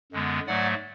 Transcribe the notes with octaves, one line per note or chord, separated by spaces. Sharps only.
F#2 D3 G#3 B3
G#2 F#3 A3 D5 F#5